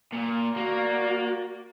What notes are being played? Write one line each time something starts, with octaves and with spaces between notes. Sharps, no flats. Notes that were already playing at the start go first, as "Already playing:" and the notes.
A#2
A#3 F#4 D5